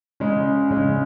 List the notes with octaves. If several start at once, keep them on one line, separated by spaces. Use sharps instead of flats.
C#3 G#3 C#4
C#3 G#3 C#4